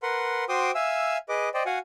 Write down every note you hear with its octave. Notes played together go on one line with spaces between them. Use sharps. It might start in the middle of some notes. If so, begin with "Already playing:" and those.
A#4 B4 F#5 C6
F#4 C5 G5 C6 D6 D#6
E5 F5 G#5 E6
G#4 B4 D#5 D6
C5 D5 D#5 G5
F#4 F5 F#5 G#5